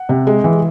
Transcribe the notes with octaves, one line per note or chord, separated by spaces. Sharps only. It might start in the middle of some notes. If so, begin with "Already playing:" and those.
Already playing: F#5
C3
G#3
E3